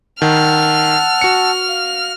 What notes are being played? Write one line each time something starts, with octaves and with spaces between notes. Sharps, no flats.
D#3 F#5 A5 E6 F6
F#4 C#7
F5